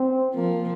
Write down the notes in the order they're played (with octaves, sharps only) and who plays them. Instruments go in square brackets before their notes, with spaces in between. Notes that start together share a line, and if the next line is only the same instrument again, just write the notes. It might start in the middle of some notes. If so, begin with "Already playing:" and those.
Already playing: [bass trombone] C4
[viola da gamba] F3 [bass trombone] A#3